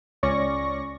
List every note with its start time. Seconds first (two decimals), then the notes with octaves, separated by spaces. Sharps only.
0.23 C#2 C#4 D5 C#6 A#6